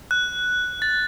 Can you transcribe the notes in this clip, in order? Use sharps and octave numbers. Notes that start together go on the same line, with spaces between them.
F#6
A6